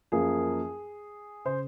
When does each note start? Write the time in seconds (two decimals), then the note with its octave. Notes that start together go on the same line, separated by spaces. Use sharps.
0.12 F#2 F3 A#3 G#4
1.45 C#3 C5